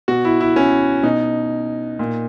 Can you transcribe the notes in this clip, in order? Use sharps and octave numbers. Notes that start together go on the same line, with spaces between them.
B2 F#4
E4
E4
C#4
B2 D#4
A#2